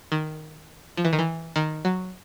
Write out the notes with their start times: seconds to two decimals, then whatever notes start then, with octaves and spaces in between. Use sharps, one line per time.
0.12 D#3
0.97 F3
1.05 E3
1.13 D#3
1.19 E3
1.56 D#3
1.85 F#3